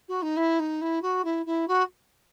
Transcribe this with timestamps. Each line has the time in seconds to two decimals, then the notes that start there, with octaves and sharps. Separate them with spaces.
0.08 F#4
0.22 D#4
0.37 E4
0.59 D#4
0.81 E4
1.02 F#4
1.24 E4
1.46 E4
1.68 F#4